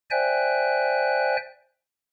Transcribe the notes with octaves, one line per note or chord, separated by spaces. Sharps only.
C5 D5 E5 G5 G#5 F#6